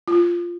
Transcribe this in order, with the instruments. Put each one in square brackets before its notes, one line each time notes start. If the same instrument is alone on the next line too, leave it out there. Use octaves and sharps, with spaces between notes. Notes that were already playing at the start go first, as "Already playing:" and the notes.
[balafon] F4